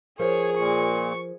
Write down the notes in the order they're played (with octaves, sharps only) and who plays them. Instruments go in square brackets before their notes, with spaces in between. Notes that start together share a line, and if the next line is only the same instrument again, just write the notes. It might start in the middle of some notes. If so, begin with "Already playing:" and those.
[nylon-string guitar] F3 A#4 C5 [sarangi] G#4 [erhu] C#5
[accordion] A#2 [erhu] C#6